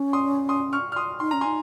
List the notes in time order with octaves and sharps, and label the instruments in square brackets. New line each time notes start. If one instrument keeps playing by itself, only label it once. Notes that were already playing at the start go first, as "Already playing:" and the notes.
Already playing: [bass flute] C#4
[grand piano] C6 D#6
C6 D#6
C#6 F6
F6
C6 D#6
[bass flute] D#4 [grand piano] C6
[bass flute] C#4 [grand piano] A#5
[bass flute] D#4 [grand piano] G#5 C6